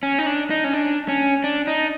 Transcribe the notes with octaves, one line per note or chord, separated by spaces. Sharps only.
C#4
D#4
D4
D#4
C#4
D4
C#4
D4
D#4